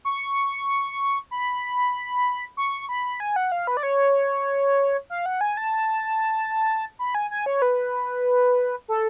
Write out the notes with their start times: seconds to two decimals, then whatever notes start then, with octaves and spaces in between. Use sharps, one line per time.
0.05 C#6
1.31 B5
2.57 C#6
2.89 B5
3.20 G#5
3.36 F#5
3.52 F5
3.67 B4
3.77 D5
3.83 C#5
5.10 F5
5.26 F#5
5.41 G#5
5.57 A5
6.99 B5
7.15 G#5
7.31 G#5
7.46 C#5
7.62 B4
8.88 A4